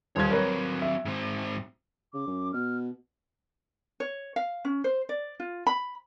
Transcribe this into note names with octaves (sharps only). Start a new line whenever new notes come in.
D#1 C#5 F5 C6 G#6
F#3 C4 A#4 B4 C#5
E5
G#2 C4
C#3 D6
F#2
B2 F6
C#5
F5
C#4
C5
D5
F4
B5